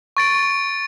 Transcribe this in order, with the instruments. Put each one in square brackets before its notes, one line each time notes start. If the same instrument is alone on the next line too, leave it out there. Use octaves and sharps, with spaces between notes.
[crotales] C#6 A6 D7